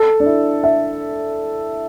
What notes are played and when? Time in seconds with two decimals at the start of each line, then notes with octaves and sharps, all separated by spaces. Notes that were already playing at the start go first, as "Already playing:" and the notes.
Already playing: A4
0.20 D4
0.26 E4
0.64 E5